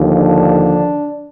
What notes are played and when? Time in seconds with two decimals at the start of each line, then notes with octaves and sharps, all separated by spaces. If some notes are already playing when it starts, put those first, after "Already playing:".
Already playing: D#2 D3 F3
0.17 D4